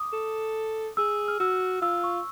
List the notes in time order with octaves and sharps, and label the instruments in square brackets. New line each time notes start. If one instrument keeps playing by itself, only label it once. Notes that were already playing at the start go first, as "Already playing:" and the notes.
Already playing: [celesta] D6 D#6
[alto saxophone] A4
[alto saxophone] G#4 [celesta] E6
[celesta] F6
[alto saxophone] F#4 [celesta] E6
[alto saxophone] F4 [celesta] E6
[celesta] C#6